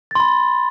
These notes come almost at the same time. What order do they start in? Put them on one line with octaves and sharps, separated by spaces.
A6 C6 B5